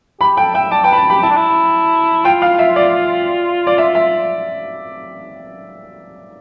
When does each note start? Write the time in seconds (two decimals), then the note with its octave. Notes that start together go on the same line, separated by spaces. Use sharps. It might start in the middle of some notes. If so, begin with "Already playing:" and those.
0.20 G4 B5
0.37 A4 G5
0.54 E5 G5
0.71 D5 A5
0.84 B4 G5
0.92 B5
0.97 A5
1.10 G4 B5
1.22 E4 A5
1.30 D4
1.36 E4
2.25 F4 G5
2.42 F5
2.59 E5
2.76 D5
3.67 D5
3.78 E5
3.95 E5